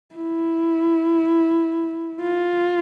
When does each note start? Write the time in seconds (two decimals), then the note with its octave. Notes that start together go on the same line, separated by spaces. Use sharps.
0.15 E4
2.21 F4